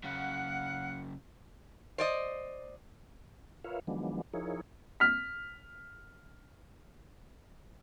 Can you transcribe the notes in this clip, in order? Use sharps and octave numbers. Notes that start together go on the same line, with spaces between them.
F#2 C#3 F5 F#5
C5 D5 D#5
F4 A#4 B4 C#5 E5 F5
D#3 F3 F#3 G#3 B3 D4
F3 D#4 E4 G#4 A#4 C#5
F6 B6